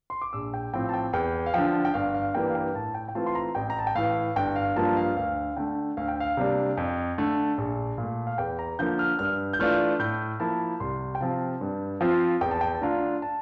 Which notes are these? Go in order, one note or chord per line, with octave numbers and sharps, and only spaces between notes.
C6
D6
A#1 E6
G5
A2 F3 C4 G5
A5
G5
E2 G5
F5
D3 F3 G5
G5
G1 F5
F5
G2 E3 G3 A#3 G5
F5
G5
A2 A5
G5
G5
E3 A3 C4 F4 A5
C6
A#5
A1 G5
A#5
A5
G5
A2 E3 F5
G1 G5
F5
G2 F3 A#3 F4 A5
F5
D2 F5
D3 A3 G5
D2 F5
G5
F5
C3 G3 A#3 D4
F2
D3 A3
A#1
A#2 A3
F5
E2 G5
A#5
D3 F3 A#3 G6
F6
G2 F6
G6
E3 A3 D4 F4 F6
A2 G6
F3 A#3 E4 A5
C2 C6
G5
C3 F3 C4 F4 A5
G2
F3 C4 F4
E2 G5
A5
G5
A5
D3 A3 D4 F4 A#5
A5